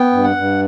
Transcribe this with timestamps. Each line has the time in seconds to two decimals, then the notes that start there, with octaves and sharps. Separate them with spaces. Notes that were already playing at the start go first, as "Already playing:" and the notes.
Already playing: B3 G5
0.12 G2
0.24 F#5
0.36 G2